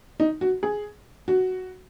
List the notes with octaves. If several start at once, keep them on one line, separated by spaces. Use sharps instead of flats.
D#4
F#4
G#4
F#4